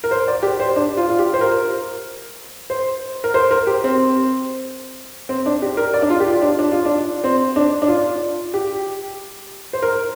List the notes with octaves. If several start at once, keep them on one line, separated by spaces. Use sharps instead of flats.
A#4
C5
D5
G4
C5
D4
F4
F4
G4
C5
A#4
C5
A#4
C5
A#4
G4
C4
C4
D4
G4
A#4
D5
D4
F4
G4
F4
D4
D4
F4
D4
C4
D4
D4
F4
G4
C5
A#4